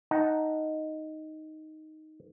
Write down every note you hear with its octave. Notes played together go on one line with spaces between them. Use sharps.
D#4 F#5 A5